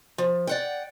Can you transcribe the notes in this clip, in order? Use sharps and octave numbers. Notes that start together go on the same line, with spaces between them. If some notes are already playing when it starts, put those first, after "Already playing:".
F3
D5 F#5 G5